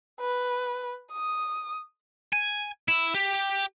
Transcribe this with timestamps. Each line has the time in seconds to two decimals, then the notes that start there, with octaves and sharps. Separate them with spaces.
0.20 B4
1.13 D#6
2.33 G#5
2.88 E4
3.15 G4